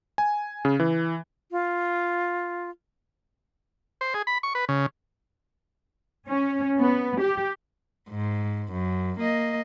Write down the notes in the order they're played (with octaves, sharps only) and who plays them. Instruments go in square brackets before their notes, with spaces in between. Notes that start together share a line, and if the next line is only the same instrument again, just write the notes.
[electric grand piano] G#5
C#3
E3
[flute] F4
[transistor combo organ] C5
G#4
B5
C#6
B4
C#3
[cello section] C#4
B3
G4
[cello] G#2
F#2
A#3 D#5